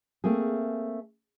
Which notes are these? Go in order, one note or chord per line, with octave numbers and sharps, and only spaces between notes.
A3 A#3 C4 G#4